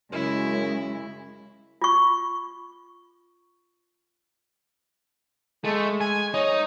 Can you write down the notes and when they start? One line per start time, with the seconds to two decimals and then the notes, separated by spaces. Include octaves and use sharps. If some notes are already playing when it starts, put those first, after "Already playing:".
0.12 F#2 C#3 G#3 E4
1.82 F4 C#6
5.65 G#3 A3
6.01 G#5
6.34 D#4 C#5